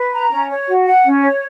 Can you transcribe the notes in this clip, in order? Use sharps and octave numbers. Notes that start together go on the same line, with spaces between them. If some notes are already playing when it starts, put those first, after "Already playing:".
Already playing: B4
A#5
C#4
C#5
F#4
F#5
C#4
C#5